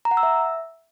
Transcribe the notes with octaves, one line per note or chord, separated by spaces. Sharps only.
A#5
F#5
E6
E5